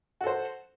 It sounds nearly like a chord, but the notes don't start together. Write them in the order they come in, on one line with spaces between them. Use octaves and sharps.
F#4 A4 C5